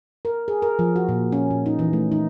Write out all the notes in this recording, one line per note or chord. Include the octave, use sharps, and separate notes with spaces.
A#4
G#4
A#4
F3
F#4
A#2
C#4
A#2
D#4
E3
A3
D#4